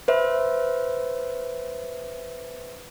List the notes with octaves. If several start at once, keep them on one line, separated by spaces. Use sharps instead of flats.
B4 C5 E5